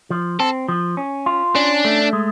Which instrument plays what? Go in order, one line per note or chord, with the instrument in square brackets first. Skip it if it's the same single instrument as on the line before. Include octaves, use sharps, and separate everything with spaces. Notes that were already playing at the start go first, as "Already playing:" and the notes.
[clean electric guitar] F3
[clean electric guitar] C4 [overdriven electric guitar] A4
[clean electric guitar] F3
C#4
F4
[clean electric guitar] C#4 [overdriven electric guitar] D4
[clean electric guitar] A3
G#3